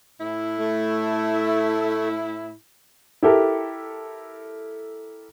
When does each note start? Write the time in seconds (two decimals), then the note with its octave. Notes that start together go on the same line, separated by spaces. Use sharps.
0.21 A2 E4
0.58 A3
3.22 E4 G4 A4 A#4